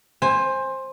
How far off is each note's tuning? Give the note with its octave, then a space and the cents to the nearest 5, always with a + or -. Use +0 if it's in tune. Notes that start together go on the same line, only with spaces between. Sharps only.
C5 +15 G#5 -15